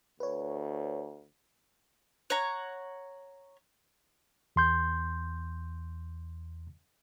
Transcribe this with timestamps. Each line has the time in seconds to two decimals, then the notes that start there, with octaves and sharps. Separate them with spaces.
0.20 D2 B4 C#5
2.30 C#5 F#5 A#5
4.56 E2 C6 G6